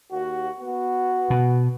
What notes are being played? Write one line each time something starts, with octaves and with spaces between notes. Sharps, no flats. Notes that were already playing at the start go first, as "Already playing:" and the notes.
D#2 F#4
B3 F#4
B2